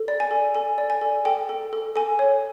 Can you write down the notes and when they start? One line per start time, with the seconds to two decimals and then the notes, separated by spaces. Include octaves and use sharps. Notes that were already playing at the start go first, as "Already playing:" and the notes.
Already playing: A4
0.08 D5
0.20 G#5
0.31 A4
0.55 A4 G#5
0.78 D5
0.90 G#5
1.01 A4
1.25 A4 G5
1.49 A4
1.73 A4
1.96 A4 G#5
2.19 C#5